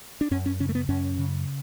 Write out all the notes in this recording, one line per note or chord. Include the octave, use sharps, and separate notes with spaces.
D4
F#2 C#4
C#4
C#3 C#4
A3
B3
F#2 C#4
C#3